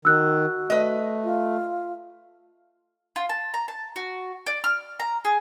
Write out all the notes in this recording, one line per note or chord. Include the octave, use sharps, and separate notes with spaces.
D#3 F#4 E6 F#6
A3 B4 D#5
F4
F4
A5
A#5
A5
F#4
D5
F6
A#5
G#4